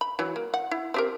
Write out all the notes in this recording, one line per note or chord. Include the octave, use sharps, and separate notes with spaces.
B5
E3 F#3
A#3
F#5
E4
C4 G4 A#4